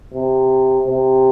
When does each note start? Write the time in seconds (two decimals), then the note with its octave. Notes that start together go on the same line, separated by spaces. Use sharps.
0.14 C3
0.87 C3